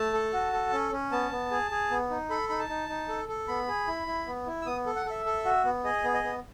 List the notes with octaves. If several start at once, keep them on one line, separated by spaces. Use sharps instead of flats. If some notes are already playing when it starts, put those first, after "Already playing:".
Already playing: A3 A5
A4
F#4
A4
C#4
C#4
B3 A5
B3
G#4
G#4
B3
D#4
A4 B5
D#4 B5
A5
D#4
D#4
A4
A4
B3 B5
G#4
E4
E4
B3
E4
E6
B3 D#6
A4
F#5
A4 E5
A4
F#4
B3
G#4 D#5
B3
D#5
B3